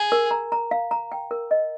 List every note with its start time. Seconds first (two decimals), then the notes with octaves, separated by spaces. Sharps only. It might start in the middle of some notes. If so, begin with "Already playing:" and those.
Already playing: G#4
0.12 A#4
0.31 A#5
0.52 A#5
0.71 F5
0.91 A#5
1.12 G5
1.31 A#4
1.51 D#5